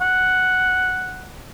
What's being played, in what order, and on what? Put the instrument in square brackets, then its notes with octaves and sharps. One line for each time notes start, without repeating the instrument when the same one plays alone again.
[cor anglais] F#5